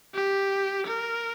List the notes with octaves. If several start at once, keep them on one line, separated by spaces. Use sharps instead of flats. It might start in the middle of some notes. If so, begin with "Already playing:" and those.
G4
A#4